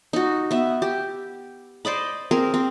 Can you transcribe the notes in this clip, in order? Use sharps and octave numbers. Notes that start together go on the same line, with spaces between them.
D#4 F#4
B3 E5
G4
C5 D5 D#5 B5
C4 G#4 A#4
C4